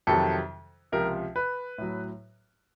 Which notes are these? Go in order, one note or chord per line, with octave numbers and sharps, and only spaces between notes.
F2 C3 D#3 F#3 A4
C#2 C3 F3 A#4
B4
A2 F#3